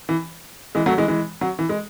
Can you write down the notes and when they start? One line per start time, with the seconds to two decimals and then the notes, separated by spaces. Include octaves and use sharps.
0.09 E3
0.75 E3 G#3
0.86 F#3 A3
0.98 E3 G#3
1.08 E3 G#3
1.41 F#3
1.59 E3
1.69 G#3